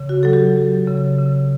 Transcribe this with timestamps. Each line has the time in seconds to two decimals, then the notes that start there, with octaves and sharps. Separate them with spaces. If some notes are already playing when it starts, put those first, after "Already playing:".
Already playing: C#3
0.09 F#4
0.23 F#3 A4
0.33 G4
0.56 F#3
0.87 C#3
1.18 C#3